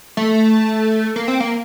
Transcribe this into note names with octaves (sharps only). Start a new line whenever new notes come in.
A3
A#3
C4
A#3